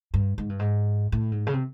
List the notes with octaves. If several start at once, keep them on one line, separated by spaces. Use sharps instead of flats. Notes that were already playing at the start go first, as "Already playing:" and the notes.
G2
G#2
G2
G#2
A2
G#2
C#3
C3